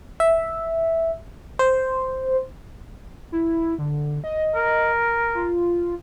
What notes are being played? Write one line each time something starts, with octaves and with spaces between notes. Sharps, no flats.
E5
C5
E4
D3
D#5
A#4
F4